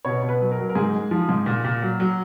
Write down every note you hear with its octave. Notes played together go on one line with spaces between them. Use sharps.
B2 C#5
B2
B4
F#3
A#4
F#3
A#4
G#2 G#4
G#3
F3
G#2
A#2
A#2
F#3
F#3